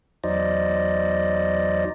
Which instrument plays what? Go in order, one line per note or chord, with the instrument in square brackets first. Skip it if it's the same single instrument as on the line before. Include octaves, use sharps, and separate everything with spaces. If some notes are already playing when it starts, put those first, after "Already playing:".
[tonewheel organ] E2 F#3 D#4 C5 D5 D#5